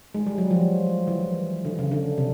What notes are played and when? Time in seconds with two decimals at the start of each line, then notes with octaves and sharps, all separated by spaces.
0.15 G#3
0.26 G3
0.38 F#3
0.51 F3
1.07 E3
1.65 D3
1.79 C#3
1.91 D3
2.18 C3